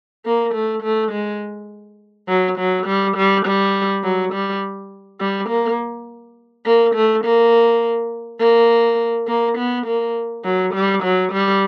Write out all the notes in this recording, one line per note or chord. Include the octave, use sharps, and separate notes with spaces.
A#3
A3
A3
G#3
F#3
F#3
G3
G3
G3
F#3
G3
G3
A#3
A#3
A3
A#3
A#3
A#3
B3
A#3
F#3
G3
F#3
G3